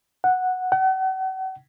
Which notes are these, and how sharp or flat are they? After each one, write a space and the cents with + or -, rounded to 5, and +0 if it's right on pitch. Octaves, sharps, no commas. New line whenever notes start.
F#5 -5
F#5 +40